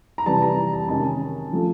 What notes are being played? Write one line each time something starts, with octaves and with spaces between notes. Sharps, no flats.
A#5
C3 E3 G3 A5
A#5
A5
C3 D#3 G#3 C#4 A5
C#3 F3 A3